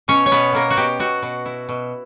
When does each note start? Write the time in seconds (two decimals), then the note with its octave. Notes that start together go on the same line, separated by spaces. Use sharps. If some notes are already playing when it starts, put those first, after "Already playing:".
0.08 B2 C#4 C#5
0.26 C#5
0.32 B2 B3 B4
0.52 B2 A#3 A#4
0.70 F#4
0.77 B2 G4
1.00 B2 F#4
1.22 B2
1.46 E4
1.69 B2